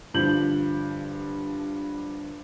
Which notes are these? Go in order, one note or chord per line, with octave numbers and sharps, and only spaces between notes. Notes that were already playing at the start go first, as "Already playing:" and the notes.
G2 D3 F3 G6 F#7